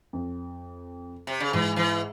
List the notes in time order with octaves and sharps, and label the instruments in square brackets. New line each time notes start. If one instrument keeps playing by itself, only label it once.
[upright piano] F2
[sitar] C3
C#3
[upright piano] G#2 [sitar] E3
[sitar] E3